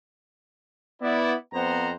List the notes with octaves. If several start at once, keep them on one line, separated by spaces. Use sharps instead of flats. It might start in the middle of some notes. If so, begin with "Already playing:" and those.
B3 E4 D5
F2 B3 C4 C5 F#5 A#5